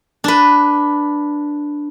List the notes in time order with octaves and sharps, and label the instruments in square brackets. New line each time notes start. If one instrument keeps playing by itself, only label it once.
[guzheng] D4 B4